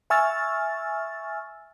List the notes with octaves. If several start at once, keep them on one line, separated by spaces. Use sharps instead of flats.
E5 G#5 C#6 E6 F6 A6